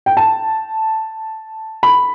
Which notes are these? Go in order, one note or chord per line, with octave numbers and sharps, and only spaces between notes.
G5
A5
B5